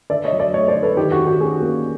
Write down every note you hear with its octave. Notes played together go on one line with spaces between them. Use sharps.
D3 D5 E5
C#5 D#5
F#3
D5 E5
A3 C#5 D#5
C5 D5
D3
A4 B4
D#3 G4
F#4
D#3
G4
C#4 F#4 G#4
A#3